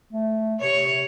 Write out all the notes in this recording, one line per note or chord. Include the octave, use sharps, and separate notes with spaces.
A3
C3 C#5